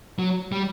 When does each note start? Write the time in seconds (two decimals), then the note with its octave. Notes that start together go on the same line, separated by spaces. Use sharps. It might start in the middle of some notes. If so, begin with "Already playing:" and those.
0.19 F#3
0.52 G3